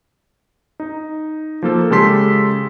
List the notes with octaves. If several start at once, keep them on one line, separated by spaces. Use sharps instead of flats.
D#4
F3 A#3 A4
C#3 G#3 G4 A4 C6 B6